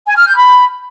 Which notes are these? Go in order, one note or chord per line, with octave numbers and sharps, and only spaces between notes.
G#5
F6
G6
B5